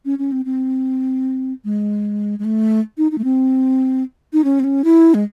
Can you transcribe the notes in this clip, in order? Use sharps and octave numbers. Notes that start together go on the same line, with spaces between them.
C#4
C#4
C4
C4
G#3
G#3
A3
D#4
D#4
A3
C4
D#4
C#4
C4
C#4
E4
G#3